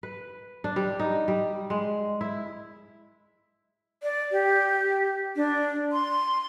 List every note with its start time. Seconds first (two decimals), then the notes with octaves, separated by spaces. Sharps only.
0.03 B4
0.64 D4
0.76 G3
1.00 D#4
1.28 G3
1.70 G#3
2.21 E4
4.03 D5
4.32 G4
5.36 D4
5.92 C6